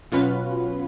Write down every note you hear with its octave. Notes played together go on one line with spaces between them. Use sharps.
B2 F#3 C#4 F4 B4